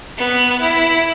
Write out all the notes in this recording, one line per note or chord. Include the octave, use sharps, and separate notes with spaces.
B3
E4